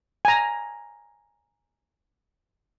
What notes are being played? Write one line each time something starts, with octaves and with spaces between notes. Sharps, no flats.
G#5 A#5